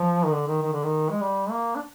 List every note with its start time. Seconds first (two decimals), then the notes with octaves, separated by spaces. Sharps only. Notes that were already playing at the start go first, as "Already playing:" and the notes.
Already playing: F3
0.25 D#3
0.32 D3
0.47 D#3
0.62 D#3
0.73 D3
0.84 D#3
1.10 G#3
1.21 G3
1.51 A#3
1.76 D4